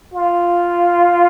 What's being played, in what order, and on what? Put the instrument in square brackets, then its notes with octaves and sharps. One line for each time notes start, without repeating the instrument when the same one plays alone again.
[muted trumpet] F4